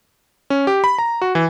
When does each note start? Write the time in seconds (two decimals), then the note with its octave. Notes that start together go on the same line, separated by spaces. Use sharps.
0.50 C#4
0.67 G4
0.84 B5
0.99 A#5
1.22 F#4
1.35 E3